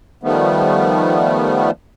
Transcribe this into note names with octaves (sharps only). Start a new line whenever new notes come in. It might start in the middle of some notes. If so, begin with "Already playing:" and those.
D#3 F3 G3 A3 B3